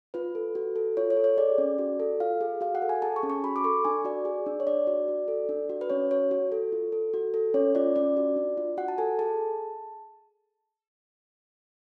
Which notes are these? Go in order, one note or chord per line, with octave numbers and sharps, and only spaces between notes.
F4 B4
A4
F#4
A4
F4 C#5
C#5
A4
C#5
G#4 D5
C#4
F#4
A4
F4 F5
G#4
F#4 F5
F#5
A4
G#5
G#4 A5
C#6
C#4
C#6
F#4 B5
D6
A4 C#6
D4 G#5
F#4 D5
G#4
D4
C#5
D4 D5
F#4
F#4
A4
D4
F#4
B4
C#4 C#5
F#4 C#5
F#4
A4
F4
A4
F#4
A4
C#4 C#5
F4 D5
C#4 D5
F#4
D4
F4
F#4 F#5
A5
A4 G#5
G#4 A5